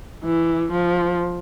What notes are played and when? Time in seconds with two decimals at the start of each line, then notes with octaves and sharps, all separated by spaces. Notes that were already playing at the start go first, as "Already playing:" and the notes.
0.25 E3
0.72 F3